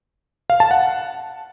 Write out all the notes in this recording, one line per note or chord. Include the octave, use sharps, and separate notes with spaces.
F5
A5
F#5